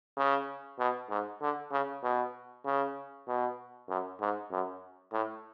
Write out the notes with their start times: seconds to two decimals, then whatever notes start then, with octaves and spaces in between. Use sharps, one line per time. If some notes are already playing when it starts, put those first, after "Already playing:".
0.17 C#3
0.79 B2
1.09 G#2
1.41 D3
1.71 C#3
2.03 B2
2.65 C#3
3.27 B2
3.89 F#2
4.20 G#2
4.51 F#2
5.13 A2